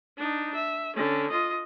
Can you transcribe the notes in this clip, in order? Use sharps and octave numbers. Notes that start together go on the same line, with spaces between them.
D4 D#4
E5
D3 C#4
F4 D#5